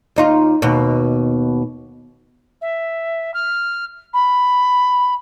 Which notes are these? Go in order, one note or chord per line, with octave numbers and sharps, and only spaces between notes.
D#2 D#4 F4
D#2 B2
E5
F6
B5